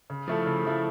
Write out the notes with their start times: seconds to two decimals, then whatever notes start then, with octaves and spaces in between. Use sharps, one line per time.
0.10 C#3
0.28 F3 A3 E4 A4
0.47 C#3
0.65 F3 A3 E4 A4